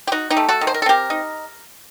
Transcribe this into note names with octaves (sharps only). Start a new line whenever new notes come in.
G4
D#4 F#4
D#4 G4
A3
F#4 A4
D#3
C5
A#4
A4
C4 G4 A#4
D#4